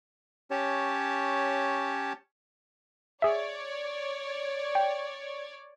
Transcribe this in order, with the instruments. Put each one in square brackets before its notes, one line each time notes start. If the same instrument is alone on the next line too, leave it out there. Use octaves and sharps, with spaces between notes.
[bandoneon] C#4 G4 C#5 A5
[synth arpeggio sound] G#4 E5 [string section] C#5 D5
[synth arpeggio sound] G5